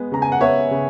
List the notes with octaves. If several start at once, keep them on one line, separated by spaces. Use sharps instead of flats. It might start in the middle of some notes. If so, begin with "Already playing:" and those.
Already playing: G#3 B3
C#3 A#5
G#5
F#5
B3 C#5 E5
C#3